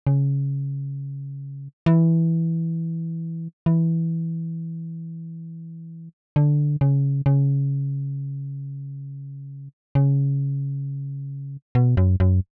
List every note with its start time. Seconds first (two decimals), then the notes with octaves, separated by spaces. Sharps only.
0.07 C#3
1.86 E3
3.66 E3
6.36 D3
6.81 C#3
7.26 C#3
9.95 C#3
11.75 B2
11.97 F#2
12.20 F#2